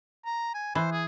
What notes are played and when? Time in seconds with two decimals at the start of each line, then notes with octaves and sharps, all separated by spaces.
0.26 A#5
0.54 G#5
0.75 E3 C5
0.92 G#4